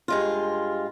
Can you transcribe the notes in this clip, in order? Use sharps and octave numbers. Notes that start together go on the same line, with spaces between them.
G2 G#3 F4